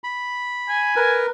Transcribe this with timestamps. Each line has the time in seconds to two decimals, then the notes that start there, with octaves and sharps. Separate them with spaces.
0.04 B5
0.69 G#5
0.96 A#4 B4